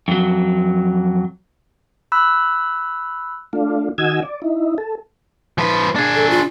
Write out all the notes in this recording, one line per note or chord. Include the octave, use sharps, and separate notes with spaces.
F2 F#3
B5 E6 F#6
A3 D4 F4
D#3 F#4 D#5 G#5 E6 G#6
D5
D#4 E4
A4
F3 B4
D4 G#4
A4
F4